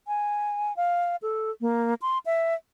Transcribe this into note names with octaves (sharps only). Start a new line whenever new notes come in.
G#5
F5
A4
A#3
C6
E5